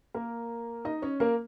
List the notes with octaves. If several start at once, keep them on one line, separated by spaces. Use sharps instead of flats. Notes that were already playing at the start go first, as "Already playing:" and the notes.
A#3 A#4
D#4 D#5
C#4 C#5
A#3 A#4